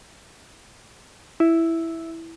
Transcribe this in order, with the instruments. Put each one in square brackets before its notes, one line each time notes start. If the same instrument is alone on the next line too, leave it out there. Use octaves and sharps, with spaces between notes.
[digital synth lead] E4